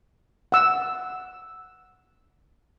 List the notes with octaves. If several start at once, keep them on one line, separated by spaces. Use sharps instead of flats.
F#5 E6